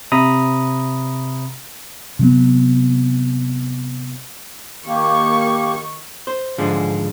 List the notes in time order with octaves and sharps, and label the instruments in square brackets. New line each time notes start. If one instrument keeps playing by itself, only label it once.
[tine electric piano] C3 E5 A#5 B5 D#6
[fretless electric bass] C3 F#3 B3
[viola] D#3 C#6 [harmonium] A#3 G4
[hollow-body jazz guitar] C5
G#2 D3 F3 G#3